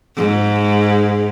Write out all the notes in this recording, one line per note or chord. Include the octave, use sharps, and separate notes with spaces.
G#2